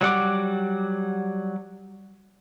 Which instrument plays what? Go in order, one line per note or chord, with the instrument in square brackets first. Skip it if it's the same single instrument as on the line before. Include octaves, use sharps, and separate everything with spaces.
[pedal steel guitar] F#3 G3 F#5 D6